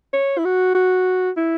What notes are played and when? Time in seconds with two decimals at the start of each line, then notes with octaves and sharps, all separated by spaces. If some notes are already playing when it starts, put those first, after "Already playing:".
0.13 C#5
0.38 E4
0.45 F#4
0.75 F#4
1.37 E4